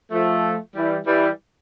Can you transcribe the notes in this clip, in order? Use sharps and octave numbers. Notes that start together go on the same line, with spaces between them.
F3 A3
E3 G3
E3 G3